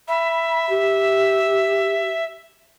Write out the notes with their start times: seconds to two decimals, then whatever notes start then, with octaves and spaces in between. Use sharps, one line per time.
0.08 E5 B5
0.69 G4